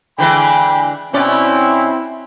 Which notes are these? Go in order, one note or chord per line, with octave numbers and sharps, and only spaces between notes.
D3 E3 G#3 G5 B5
B2 C4 C#4 E4 D5